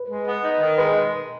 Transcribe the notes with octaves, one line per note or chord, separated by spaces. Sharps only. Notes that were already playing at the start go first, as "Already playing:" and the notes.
Already playing: B4
G#3
B3
D#4
D#3
G#3 B4